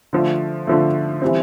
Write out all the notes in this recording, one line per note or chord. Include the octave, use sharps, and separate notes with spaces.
D3 F3 A3
D3 F3 A3
E3 G3 C4